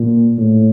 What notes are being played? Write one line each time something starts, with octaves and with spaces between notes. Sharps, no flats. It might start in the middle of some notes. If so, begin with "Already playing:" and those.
Already playing: A#2
A2